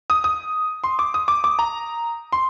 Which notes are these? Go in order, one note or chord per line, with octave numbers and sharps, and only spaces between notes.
D#6
D#6
C6
D6
D#6
D6
D6
A#5
C6